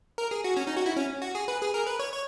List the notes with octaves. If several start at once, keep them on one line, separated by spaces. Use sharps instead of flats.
A#4
G#4
F#4
C#4
D#4
F#4
E4
C#4
F#4
G#4
B4
G#4
A#4
B4
C#5
C#5